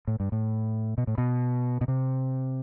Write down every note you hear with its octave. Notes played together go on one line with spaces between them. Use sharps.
A2
G2
A2
B2
A2
B2
B2
C3